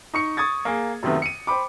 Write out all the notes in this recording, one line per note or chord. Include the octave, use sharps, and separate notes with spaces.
D#4 C#6 C#7
C#6 D#6 G#6 A6
A#3 G#4
F#2 C3 D#3 A3 B3
C#7 D#7
C5 G5 B5 D6